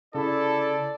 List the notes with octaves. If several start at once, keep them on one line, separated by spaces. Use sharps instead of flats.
C#3 E4 A4 D5